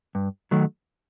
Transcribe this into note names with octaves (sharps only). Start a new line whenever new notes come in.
G2
D#3 F#3 A3